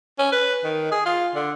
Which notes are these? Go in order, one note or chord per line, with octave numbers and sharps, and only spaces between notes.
C#4
B4
D#3
G#4
F4
D3